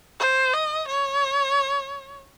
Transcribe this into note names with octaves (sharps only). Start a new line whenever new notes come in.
C5
D#5
C#5